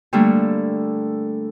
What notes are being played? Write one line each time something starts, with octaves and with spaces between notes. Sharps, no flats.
D3 G3 A3 A#3